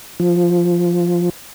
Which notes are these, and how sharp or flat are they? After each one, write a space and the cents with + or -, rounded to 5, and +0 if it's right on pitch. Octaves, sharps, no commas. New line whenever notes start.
F3 +0